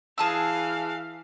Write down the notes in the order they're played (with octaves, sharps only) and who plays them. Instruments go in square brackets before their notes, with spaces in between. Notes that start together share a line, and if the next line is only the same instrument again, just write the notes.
[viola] E3 F5 [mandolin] G#4 A5 E6